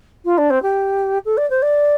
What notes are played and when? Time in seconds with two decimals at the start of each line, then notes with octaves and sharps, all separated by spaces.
0.25 F4
0.38 D4
0.50 C4
0.62 G4
1.25 A4
1.37 D5
1.50 C5
1.62 D5